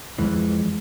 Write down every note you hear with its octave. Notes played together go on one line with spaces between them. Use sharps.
F2 E3 G#3